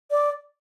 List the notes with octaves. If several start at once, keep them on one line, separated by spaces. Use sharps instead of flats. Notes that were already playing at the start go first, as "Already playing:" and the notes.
D5